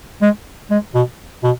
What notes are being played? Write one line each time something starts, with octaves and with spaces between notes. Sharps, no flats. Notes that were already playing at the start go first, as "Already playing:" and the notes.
G#3
G#3
B2
B2